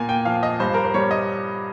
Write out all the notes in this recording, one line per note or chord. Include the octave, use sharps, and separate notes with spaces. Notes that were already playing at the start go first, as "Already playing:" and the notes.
Already playing: A#2 A#3 A#4 G#5
G5
F3 F5
D#5
G2 C5
A#4
C5
G3 C#5
D#5